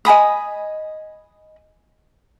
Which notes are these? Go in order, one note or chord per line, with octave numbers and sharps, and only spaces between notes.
D#5 G#5 B5 D#6